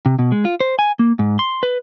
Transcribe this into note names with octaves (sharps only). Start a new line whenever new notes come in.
C3
B2
G#3
F4
C5
G#5
A#3
G#2
C6
B4